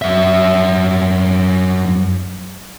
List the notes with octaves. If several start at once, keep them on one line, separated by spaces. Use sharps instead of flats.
F#2 E5